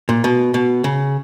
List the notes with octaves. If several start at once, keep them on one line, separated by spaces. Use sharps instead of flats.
A#2
B2
B2
C#3